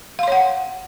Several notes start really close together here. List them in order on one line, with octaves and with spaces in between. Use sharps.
F5 C6 C#5 F#5